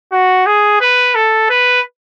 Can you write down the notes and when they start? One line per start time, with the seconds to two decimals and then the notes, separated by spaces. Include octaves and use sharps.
0.12 F#4
0.46 G#4
0.81 B4
1.15 A4
1.50 B4